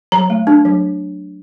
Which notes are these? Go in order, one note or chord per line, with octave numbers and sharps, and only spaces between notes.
F#3 A#5
A3
D4
F#3